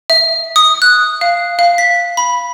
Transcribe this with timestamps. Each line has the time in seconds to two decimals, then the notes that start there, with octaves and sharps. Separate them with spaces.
0.10 E5
0.56 D#6
0.82 F#6
1.21 F5
1.59 F5
1.78 B6
2.17 B5